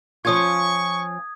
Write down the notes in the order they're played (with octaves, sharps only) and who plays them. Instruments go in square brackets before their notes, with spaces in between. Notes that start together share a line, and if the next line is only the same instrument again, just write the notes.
[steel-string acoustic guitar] F3 C#4 F4 [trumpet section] C#6 [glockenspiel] D#6 G#6